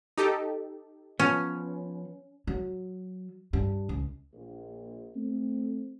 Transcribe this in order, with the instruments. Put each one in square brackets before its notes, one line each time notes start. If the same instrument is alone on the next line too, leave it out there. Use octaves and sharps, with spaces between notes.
[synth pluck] D#4 G4 A4
[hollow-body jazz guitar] F3 B3 [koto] C#4
[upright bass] F#3
G2
C#2
[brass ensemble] A#1
A3 C4